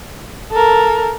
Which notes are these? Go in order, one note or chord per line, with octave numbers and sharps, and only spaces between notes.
A4 A#4